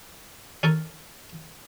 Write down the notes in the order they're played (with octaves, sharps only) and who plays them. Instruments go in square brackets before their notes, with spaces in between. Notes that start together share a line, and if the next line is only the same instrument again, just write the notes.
[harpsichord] C#4 A4 A#4